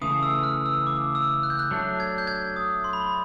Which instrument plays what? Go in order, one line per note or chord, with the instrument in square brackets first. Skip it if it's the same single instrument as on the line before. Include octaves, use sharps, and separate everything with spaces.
[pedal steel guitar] C#3 E3 A3 [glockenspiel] D#6
[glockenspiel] E6
F6
E6
D6
E6
F#6
G6
F#6
[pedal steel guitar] F#3 A3 D4
[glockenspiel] G#6
G6
G#6
D#6
C6
B5
C6